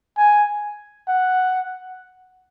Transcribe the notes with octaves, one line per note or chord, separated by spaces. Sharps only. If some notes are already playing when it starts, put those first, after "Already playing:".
G#5
F#5